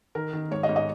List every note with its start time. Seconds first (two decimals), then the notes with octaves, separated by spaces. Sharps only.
0.15 D#3 A#4
0.33 D#3
0.51 G#2 C#5
0.63 D#5
0.69 G#2
0.76 D#5